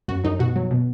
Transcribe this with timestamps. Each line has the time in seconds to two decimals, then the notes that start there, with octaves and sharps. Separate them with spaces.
0.08 F#2 F#4
0.24 F#2 D#4
0.39 B2 F#4
0.56 F#3
0.71 B2